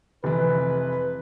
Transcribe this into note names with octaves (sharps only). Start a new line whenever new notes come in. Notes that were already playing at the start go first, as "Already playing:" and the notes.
F1 E3 B4